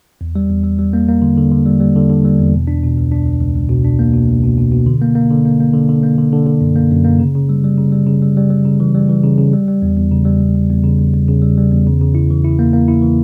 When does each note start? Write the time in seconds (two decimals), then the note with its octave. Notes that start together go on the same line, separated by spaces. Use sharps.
0.21 E2
0.36 G3
0.50 E2
0.63 G3
0.79 G3
0.93 A#3
1.08 A#3
1.22 D3
1.37 D3
1.52 D3
1.66 G3
1.80 G3
1.96 D3
2.09 D3
2.25 G3
2.39 E2
2.54 B2
2.67 D4
2.83 B2
2.98 C#2
3.12 D4
3.26 C#2
3.40 C#2
3.56 C#2
3.69 B2
3.84 D4
3.99 A#3
4.14 B2
4.29 C#2
4.43 B2
4.58 B2
4.71 B2
4.86 D3
5.02 A#3
5.15 A#3
5.31 D3
5.45 A#3
5.60 A#3
5.73 D3
5.89 D3
6.03 A#3
6.18 D3
6.33 D3
6.46 D3
6.61 F#2
6.75 A#3
6.91 F#2
7.05 A#3
7.19 C#3
7.35 C#3
7.49 G3
7.64 G3
7.78 C#3
7.92 G3
8.07 C#3
8.22 G3
8.37 G3
8.50 G3
8.65 C#3
8.80 E3
8.95 G3
9.09 E3
9.23 C#3
9.38 C#3
9.53 G3
9.68 G3
9.82 E2
9.97 E2
10.11 C#3
10.25 G3
10.41 E2
10.55 E2
10.70 E2
10.84 C#3
10.98 E2
11.14 E2
11.28 C#3
11.42 G3
11.58 G3
11.72 E2
11.86 C#3
12.01 C#3
12.15 E4
12.30 E3
12.44 E4
12.59 A#3
12.73 A#3
12.88 E4
13.02 E3